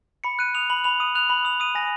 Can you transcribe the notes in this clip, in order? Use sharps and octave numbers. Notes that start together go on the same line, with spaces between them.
B5 C#7
F#6 D#7
D#6 F7
B5 F#7
B5 F7
D#6 D#7
F#6 F7
B5 F#7
D#6 F7
D#6 D#7
G#5 A#6